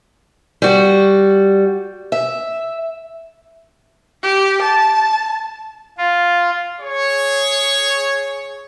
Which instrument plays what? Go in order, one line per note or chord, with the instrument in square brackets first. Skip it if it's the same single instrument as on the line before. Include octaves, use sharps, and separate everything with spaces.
[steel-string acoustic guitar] G3 F#4
E5
[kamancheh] G4
A5
[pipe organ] F4
[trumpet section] G#4 C#5